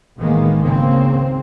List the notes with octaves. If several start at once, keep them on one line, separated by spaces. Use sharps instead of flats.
A1 D#3 G#3 A#3 B3
G#1 C#2 C#3 A#3 C4